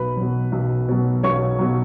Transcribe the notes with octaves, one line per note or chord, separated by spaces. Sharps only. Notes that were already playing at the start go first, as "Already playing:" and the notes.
Already playing: B1 B4 B5
B2 F#3
B1
B2 F#3
B1 C#5 C#6
B2 F#3